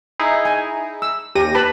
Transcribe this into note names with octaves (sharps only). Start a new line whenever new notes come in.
D#4 E4 G#4
G#5
E6
D#2 G4 A#6 D#7
B4 A5 B5